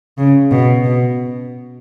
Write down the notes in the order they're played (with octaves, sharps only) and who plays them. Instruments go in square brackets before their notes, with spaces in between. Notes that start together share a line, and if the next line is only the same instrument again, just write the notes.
[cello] C#3
B2
B2